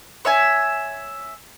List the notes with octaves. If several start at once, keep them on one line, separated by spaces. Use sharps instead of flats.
C#5 E5 G#5